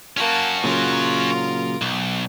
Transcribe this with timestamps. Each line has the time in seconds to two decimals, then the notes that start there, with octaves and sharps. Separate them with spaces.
0.17 A#3 C#4 F#4 A5
0.64 A#2 C#3 F#3 F4 A#4
1.82 B1